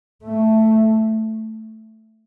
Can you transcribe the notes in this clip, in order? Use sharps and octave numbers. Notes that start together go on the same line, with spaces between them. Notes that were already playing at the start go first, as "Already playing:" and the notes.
A3